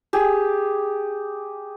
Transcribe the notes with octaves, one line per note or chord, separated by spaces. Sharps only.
G4 G#4